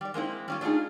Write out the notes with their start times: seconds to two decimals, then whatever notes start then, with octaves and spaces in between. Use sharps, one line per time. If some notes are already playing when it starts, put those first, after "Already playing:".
0.01 G3 D5
0.14 G#3 A#3 C4 E4
0.48 G3 C#4 F4
0.61 F#3 A3 D4 D#4 F4 G#4